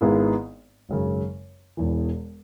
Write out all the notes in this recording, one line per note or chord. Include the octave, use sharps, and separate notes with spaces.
G#1 G#2 G#3 B3 E4
G#1 F#2 C#3
E1 E2 E3